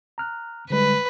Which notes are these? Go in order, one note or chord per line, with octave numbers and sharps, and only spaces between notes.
A#5 F6 F#6
D3 G3 G#3 B4